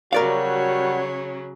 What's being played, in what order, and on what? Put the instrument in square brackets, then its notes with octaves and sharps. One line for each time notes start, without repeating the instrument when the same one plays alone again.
[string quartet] C#3 F#3 [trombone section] G3 F#4 [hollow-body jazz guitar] A#4 D5 F5 [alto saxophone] C#5